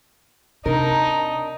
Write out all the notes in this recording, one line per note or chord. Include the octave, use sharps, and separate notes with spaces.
C3 D4 D#4 A#4